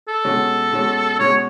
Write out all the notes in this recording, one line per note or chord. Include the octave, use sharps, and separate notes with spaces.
A4
B2 G#3 C#4
B2 G#3 C#4
B2 G#3 C#4 C#5